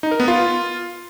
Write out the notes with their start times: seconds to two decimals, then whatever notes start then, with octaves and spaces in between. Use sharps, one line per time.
0.03 D#4
0.11 A#4
0.20 B3
0.28 F4